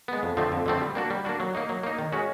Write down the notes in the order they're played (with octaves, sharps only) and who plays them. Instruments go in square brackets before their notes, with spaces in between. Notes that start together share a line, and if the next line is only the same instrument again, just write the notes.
[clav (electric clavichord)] G#3 B3
F2
D3 F3 A3 C4
F2
D3 F3 A3 C4
G3
A#3 D4 F#4
G3
A#3 D4 F#4
F#3
A#3 D#4
F#3
A#3 D#4
D#3
G#3 C#4 F#4